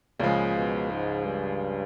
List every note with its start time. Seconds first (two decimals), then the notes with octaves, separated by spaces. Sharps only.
0.19 C#2 A#2 C#3 F3 G#3
0.55 B2
0.90 G#2
1.26 G2